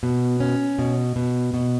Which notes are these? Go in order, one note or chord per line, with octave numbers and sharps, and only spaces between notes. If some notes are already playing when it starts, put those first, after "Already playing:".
B2
C#4
B2
B2
B2